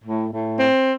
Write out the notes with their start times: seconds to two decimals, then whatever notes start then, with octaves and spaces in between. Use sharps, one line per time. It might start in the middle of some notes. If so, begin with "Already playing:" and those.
0.04 A2
0.32 A2
0.60 C4